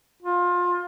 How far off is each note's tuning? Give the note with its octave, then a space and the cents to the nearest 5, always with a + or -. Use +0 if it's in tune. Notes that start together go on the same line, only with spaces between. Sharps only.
F4 +25